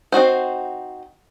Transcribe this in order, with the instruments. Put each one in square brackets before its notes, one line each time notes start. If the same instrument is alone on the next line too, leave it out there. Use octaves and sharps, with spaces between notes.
[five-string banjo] C4 D#4 F#4 C5